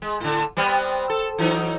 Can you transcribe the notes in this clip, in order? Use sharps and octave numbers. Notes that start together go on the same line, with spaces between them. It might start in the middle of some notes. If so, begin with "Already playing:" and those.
G#3
A2 D3
G3 B3 C4
A4
E3 F#3 D#4